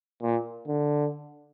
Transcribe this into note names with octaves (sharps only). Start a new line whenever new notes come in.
A#2
D3